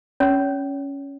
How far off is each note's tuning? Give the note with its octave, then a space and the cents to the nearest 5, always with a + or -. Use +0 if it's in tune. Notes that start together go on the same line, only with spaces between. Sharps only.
C#4 +0 C#5 +30